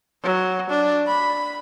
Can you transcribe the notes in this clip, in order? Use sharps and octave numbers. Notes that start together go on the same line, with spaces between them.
F#3
D4
B5